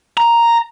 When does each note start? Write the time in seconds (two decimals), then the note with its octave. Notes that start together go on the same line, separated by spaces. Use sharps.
0.17 A#5